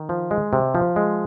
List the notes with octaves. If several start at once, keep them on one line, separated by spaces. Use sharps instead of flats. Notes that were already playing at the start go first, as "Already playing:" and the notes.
Already playing: D#3
F3
G#3
C3
F3
G#3